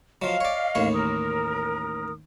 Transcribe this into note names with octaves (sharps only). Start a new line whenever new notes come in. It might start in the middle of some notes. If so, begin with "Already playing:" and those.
F3 F#3 D#5 F5
C#5 D5
A1 D#2 C#5
A#4 D#6